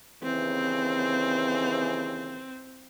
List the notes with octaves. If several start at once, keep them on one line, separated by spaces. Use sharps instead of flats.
D#2 C#3 E3 C4